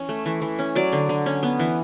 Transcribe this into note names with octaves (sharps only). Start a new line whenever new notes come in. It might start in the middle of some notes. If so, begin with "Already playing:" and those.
Already playing: E3 C#4
A3
E3
E3
C#4
F#3 D5
D3
D3
C#4
B3
E3